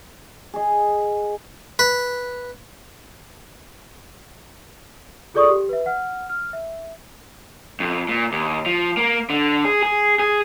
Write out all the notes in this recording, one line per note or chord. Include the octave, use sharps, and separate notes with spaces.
G#4 D#5
B4
F4 G#4 A4 D5 C#6 D#6
G4
B4 E5
F#5 F6
F6
E5
F2
A#2
D#2
F3
A#3
D3
G#4
G#4
G#4